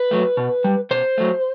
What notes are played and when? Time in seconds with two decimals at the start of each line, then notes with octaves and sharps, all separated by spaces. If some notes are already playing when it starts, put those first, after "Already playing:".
Already playing: B4
0.11 F#3 A3
0.37 B2
0.64 G3
0.91 B2 C5
1.18 F#3 A3